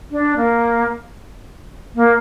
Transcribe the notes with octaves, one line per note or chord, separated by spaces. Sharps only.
D4
A#3
A#3